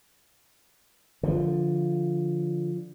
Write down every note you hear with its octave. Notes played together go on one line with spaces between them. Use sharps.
D3 F3